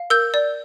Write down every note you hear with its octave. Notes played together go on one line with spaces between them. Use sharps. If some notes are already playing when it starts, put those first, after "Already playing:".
Already playing: F5
A#4 E6 G6
D5